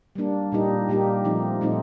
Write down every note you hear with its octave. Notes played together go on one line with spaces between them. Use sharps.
G3 A#3 D4
A#2 G3 A#3 D#4 G4
A#2 G3 A#3 D#4 G4
A#2 F3 A3 C4 D#4
A#2 F3 A3 C4 D#4